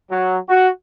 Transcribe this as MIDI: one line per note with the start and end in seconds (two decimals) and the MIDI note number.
0.11 0.38 54
0.49 0.68 66